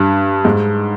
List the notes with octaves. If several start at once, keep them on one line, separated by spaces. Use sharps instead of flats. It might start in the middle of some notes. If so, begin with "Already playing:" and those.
Already playing: G2
G#2